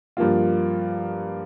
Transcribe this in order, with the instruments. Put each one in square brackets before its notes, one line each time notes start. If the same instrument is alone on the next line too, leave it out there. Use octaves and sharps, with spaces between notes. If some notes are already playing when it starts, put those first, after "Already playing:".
[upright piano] G2 F3 A#3 F4